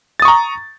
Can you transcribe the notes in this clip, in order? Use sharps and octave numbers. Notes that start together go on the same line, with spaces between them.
A#5 C#6 D#6 A6